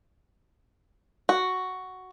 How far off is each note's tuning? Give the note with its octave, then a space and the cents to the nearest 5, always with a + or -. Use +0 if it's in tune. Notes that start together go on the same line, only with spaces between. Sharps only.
F#4 +5